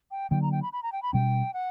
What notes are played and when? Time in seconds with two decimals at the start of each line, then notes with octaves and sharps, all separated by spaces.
0.11 G5
0.31 D3 F#3 A#3 D4 G5
0.42 A#5
0.52 G5
0.62 B5
0.73 B5
0.83 A#5
0.92 G5
1.02 B5
1.13 B2 G3 C#4 G5
1.53 F#5